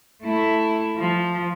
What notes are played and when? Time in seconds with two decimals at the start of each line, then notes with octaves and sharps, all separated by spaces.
0.23 A3 E4
0.97 F3